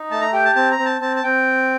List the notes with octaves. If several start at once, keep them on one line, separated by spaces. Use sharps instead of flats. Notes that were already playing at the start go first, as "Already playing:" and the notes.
Already playing: D#4
A3 A5
A#5
G4 G5
A5
C4 A5
A#5
C4
A5
C4 A5
A5
C4 G5